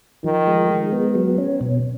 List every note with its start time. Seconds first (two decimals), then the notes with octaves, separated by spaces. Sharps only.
0.24 D#3 F3
0.47 G#3
0.70 G#3
0.92 B3
1.15 F#3
1.38 C#4
1.61 B2